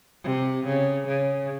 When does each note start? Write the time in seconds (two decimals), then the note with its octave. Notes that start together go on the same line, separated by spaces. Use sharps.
0.23 C3
0.66 C#3
1.08 C#3